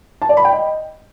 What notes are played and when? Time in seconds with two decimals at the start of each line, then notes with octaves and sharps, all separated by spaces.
0.22 A5
0.29 D5
0.37 B5
0.45 G5
0.52 D#5